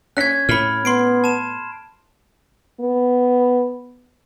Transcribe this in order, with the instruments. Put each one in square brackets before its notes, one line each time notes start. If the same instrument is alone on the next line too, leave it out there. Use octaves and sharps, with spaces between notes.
[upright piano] C#4 B6 [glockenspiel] F#6 G#6
[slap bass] A2 [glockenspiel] B5 F6
[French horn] B3 [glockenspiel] C6 C7 D7
[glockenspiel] A5 E7
[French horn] B3